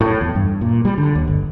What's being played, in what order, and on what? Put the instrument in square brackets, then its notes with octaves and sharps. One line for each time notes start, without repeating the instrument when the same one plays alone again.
[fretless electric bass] A2
E2
G2
A#2
G3
D3
D#2
G1